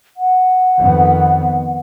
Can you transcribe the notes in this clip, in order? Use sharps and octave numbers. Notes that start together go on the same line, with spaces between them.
F#5
F2 D#3 B3